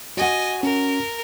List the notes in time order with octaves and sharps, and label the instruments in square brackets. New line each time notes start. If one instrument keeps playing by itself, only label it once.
[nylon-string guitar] F#4 F#5 [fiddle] D#5 G#5
[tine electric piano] C#4 [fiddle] A#4